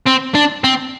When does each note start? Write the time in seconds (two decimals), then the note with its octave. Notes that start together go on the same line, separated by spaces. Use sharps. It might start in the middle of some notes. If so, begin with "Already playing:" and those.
0.06 C4
0.35 D4
0.64 C4